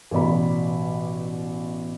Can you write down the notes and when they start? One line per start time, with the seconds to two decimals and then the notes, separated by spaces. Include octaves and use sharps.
0.11 A1 B2 D5 B5